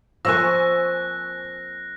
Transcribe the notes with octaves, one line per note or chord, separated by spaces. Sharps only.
F3 A#3 C4 G#5 C#6 E6 F#6 A#6